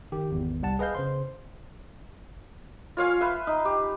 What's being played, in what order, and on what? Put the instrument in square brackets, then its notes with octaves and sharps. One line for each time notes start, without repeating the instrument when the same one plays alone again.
[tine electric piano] D#3 G4
G#1 E2
C2 G3 F#5 A5
G#4 B4 D#5 F5 G6
C#3 C5 C6
[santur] F4 C#5 F5 G#5
B4 E5 C6
D#4
G4